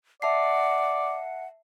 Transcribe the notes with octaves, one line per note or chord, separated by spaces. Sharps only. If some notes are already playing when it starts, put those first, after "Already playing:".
D5 E5 F#5 A5 C7